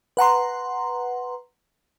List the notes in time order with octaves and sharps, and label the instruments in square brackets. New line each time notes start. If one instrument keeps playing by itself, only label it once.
[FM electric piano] B4 F#5 A#5 C6